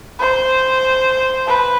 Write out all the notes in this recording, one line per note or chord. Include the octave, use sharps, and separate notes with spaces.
C5
B4